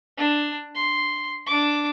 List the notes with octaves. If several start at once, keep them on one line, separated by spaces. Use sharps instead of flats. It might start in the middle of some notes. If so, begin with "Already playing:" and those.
D4
C6
D4 D6